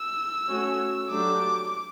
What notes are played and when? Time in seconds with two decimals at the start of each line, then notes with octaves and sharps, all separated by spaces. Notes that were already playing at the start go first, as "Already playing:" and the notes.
Already playing: E6
0.48 A3 C#4 F#4 C#5
1.11 F#3 A3 D4 G4 D6